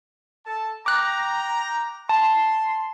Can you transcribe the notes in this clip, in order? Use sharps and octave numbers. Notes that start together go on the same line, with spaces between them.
A4 A5
G5 A#5 D6 F#6
A5 C6